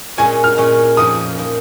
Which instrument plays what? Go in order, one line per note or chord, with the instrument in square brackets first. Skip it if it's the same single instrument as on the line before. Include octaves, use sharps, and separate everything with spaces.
[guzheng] A#2 G#3 C#4 [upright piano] G#5
[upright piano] F6
[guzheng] A#2 G#3 C#4
[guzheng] F2 F3 A#3 D#4 [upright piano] D#6
[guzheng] F3 A#3 D#4